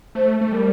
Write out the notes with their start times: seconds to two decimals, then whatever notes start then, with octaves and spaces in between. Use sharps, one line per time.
0.15 A3 C5
0.41 A3
0.52 G3 A#4